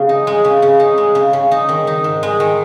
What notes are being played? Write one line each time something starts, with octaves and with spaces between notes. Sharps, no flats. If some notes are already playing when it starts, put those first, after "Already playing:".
Already playing: C#3 G#3
D#4
G#3
C#3
C#3
D#4
G#3
C#3
C#3
D#4
D#3
D#4
G#2
G#3
D#3